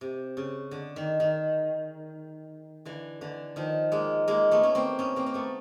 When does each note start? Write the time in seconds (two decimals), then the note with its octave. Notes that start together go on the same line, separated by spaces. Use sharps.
0.01 C3
0.37 C#3
0.71 D3
0.96 D#3
1.20 D#3
2.85 D3 E3
3.21 D3 E3
3.56 D#3 F3
3.92 G#3 A#3
4.28 G#3 A#3
4.51 A3 B3
4.63 C#4
4.75 A#3 C4
4.99 B3 C#4
5.16 A#3 C4
5.26 A#3
5.34 A3 B3